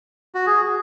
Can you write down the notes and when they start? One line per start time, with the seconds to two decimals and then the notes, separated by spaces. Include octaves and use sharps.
0.35 F#4
0.46 G#4